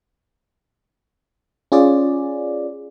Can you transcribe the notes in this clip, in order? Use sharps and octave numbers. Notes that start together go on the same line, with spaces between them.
C#4 F4 G#4 D5